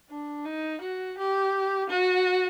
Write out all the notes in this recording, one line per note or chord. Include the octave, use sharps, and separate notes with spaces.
D4
D#4
F#4
G4
F#4